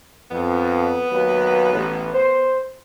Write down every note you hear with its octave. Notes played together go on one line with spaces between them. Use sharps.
F2 B3
D#2 F#3 B4
A1
C5